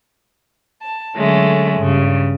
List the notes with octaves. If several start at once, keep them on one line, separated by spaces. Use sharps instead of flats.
A5
D3 F#3 G#3 A3 C#4
G2 C#3